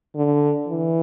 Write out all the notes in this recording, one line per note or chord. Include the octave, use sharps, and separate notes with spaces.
D3
E3